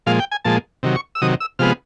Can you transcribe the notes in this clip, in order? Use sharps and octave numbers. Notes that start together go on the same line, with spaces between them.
A#2 F3 G#3 F5
G5
G#5
A#2 F3 G#3 A5
C3 D#3 F#3
C#6
E6
C3 D#3 F#3 D#6
E6
C3 F3 G#3 B3 F6